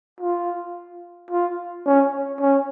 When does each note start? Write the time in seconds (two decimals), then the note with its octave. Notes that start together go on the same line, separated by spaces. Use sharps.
0.21 F4
1.31 F4
1.86 C#4
2.41 C#4